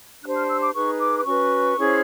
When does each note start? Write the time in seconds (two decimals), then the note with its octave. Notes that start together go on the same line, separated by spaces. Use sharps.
0.22 D4 G4 C5 F#6
0.35 F6
0.48 E6
0.61 D6
0.73 D#4 G#4 B4 C#6
0.99 D6
1.19 D6
1.25 C#4 F#4 B4 C#6
1.77 C#4 E4 G#4 C5